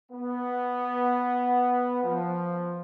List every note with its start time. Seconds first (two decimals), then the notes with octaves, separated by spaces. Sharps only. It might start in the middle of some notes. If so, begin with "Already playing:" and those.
0.11 B3
2.03 F3